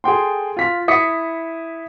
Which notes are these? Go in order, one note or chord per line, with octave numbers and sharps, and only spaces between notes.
G#4 A4 G5 C6
F4 B6
E4 D#6 B6 C#7